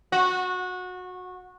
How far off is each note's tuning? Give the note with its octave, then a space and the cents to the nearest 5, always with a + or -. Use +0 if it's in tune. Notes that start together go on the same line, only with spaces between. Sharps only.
F#4 -20